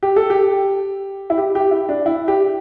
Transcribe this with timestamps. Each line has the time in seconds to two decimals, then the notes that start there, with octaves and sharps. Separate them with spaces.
0.03 G4
0.16 A4
0.30 G4
1.30 E4
1.38 G4
1.55 G4
1.71 E4
1.89 D4
2.06 E4
2.28 G4